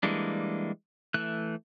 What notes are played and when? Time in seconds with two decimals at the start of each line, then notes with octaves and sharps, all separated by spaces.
0.03 E3 G3 G#3 A#3 D4
1.14 E3 A3 F#6